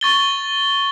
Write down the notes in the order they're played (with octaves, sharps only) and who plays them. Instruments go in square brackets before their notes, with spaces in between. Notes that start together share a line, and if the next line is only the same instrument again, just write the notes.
[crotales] C#6 A6 G7